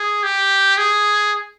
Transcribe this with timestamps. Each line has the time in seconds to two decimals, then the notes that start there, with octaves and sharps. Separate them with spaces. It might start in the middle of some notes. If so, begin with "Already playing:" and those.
Already playing: G#4
0.23 G4
0.77 G#4